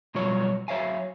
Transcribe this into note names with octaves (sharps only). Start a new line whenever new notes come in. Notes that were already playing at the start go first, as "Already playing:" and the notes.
B2 F#3 G3 F4 C#5
F#3 C#5 E5 F5 G#5